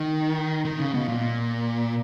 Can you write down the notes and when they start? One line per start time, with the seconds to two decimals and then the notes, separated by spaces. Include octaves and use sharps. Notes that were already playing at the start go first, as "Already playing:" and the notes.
Already playing: D#3
0.65 D#3
0.79 C#3
0.94 B2
1.08 A#2